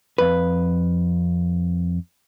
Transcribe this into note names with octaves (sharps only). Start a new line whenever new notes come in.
F2 B4